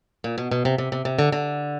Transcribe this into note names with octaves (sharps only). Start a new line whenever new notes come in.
A#2
B2
B2
C3
C3
C3
C3
D3
D3